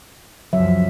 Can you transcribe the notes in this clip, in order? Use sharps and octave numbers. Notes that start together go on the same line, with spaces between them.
C#2 F#2 F3 F#3 E5